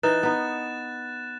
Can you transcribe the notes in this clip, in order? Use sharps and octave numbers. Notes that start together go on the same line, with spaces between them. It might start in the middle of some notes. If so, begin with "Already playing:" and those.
E3 D#4 A#4 B4 F#6 A6 E7
B3 D#4